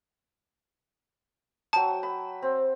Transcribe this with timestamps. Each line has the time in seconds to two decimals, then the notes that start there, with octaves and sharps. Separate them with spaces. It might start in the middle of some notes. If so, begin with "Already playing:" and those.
1.73 F#3 G5 A5
2.03 B5
2.42 C4